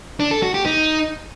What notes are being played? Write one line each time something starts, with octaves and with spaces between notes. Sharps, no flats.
D4
A4
F#4
G4
D#4